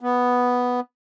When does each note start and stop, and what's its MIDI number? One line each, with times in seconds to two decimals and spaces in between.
0.01 0.80 59